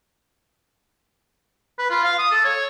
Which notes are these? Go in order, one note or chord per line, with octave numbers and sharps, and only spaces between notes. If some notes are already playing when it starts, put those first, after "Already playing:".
B4
F4
F5
D#6
A4
C#5